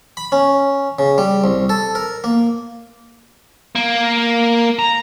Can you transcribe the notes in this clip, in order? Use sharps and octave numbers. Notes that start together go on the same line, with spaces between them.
B5
C#4
C#3
G3
C2
A4
A#4
A#3
A#3
A#5